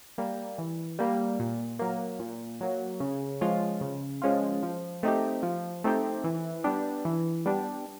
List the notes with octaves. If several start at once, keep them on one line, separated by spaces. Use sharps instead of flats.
G3 A#3
E3
G3 A#3
A#2
F#3 A#3
A#2
F#3 A#3
C#3
F3 G#3 C#4 F4
C#3
F3 G#3 C#4 F4
F3
A3 C4 D#4 G4
F3
A3 C4 D#4 G4
E3
G3 B3 D4 G4
E3
G3 B3 D4 G4